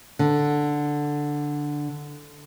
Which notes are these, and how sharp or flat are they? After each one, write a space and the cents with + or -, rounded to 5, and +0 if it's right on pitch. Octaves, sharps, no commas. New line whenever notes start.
D3 +0